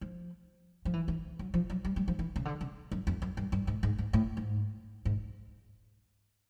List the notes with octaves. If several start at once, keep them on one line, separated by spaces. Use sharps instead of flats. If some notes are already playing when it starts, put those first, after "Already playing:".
F3
F3
E3
E3
F#3
F3
F#3
G3
G3
F3
E3
C#3
D3
C#3
F#2
F2
F#2
G2
G2
G#2
G#2
G#2
A2
G#2
G#2